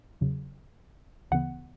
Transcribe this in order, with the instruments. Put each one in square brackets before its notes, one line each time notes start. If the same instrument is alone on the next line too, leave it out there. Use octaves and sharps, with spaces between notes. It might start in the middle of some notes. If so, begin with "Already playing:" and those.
[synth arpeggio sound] E2 C#3 F#3
D2 C#3 E3 B3 F#5